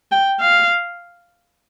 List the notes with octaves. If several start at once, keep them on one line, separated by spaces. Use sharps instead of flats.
G5
F5